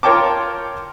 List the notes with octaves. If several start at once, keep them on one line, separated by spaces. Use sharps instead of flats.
F4 A#4 C#5 G5 A5 D6